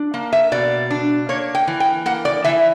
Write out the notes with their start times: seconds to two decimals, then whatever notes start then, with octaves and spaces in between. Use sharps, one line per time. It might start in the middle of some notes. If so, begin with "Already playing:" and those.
Already playing: D4
0.14 A#3
0.33 E5
0.52 B2 D5
0.90 D4
1.29 A#3 C#5
1.55 G5
1.67 E3
1.80 G5
2.06 A#3 F#5
2.25 D5
2.44 E3 E5